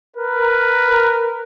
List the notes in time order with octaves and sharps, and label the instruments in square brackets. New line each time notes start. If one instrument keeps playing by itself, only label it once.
[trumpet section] A#4 [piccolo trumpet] B4